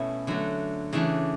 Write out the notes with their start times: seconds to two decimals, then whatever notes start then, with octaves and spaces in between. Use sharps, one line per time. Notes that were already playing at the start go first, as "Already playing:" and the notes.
Already playing: B2 A3 C#4 E4
0.27 D3 F#3 A3
0.93 C#3 E3 A3 D4